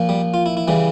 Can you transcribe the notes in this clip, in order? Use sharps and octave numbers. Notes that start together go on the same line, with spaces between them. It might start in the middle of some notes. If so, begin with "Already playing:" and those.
Already playing: A#2 F3
G3
F4
E4
E4
C#3 E3 G3